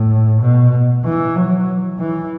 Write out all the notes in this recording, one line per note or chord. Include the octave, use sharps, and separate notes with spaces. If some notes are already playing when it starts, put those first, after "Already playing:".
Already playing: A2
B2
E3
F#3
E3